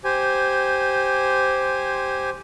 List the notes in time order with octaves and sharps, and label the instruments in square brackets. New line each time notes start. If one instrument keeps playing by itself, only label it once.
[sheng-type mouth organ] G4 C5 G#5